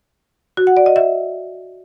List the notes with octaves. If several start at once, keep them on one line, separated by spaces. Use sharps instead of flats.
F#4
F#5
D5
D#5
E5